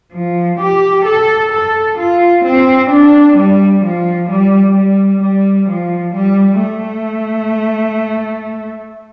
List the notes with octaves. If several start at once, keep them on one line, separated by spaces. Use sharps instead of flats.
F3
G4
A4
A4
F4
C4
D4
G3
F3
G3
G3
G3
F3
G3
A3